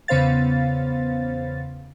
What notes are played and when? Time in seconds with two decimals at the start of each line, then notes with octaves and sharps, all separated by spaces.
0.08 E2 C#3 B3 C5 F5 A6